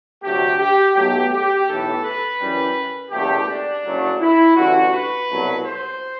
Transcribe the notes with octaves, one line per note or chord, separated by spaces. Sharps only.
D2 C3 F#3 A3 G4
G4
B1 B2 F#3 A3 G4
G4
B1 A2 E3 A4
B4
F#2 E3 G3
F#1 E2 B2 A3 G4
D4
F#1 F#2 F#3 A3
E4
A1 G2 D3 F#4
B4
C2 B2 F#3 A3
C5